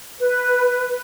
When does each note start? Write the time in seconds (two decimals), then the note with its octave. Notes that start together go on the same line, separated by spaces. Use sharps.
0.19 B4